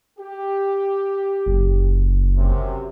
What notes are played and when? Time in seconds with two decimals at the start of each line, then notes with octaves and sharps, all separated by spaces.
0.19 G4
1.46 F#1
2.36 F#2 C3